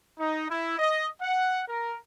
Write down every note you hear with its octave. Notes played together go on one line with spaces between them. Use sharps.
D#4
E4
D#5
F#5
A#4